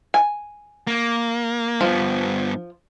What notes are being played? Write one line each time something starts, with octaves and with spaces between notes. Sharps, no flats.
G#5
A#3
G2 F3 B3